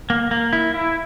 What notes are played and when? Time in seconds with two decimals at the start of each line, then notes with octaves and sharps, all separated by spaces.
0.10 A#3
0.31 A#3
0.53 E4
0.74 E4